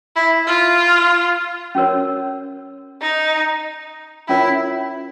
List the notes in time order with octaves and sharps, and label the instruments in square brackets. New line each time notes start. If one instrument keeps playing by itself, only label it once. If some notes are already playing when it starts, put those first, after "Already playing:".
[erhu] E4
F4
[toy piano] C#4 F#4 A#4 C#5
[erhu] D#4
[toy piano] C#4 F4 A#4 C#5 [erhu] E4